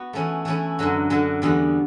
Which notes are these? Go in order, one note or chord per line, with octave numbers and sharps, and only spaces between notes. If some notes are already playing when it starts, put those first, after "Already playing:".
Already playing: B3 F#4
E3 A3 C#4 E4
E3 A3 C#4 E4
F#2 D3 F#3
F#2 D3 F#3
E2 D3 G3 B3 F#4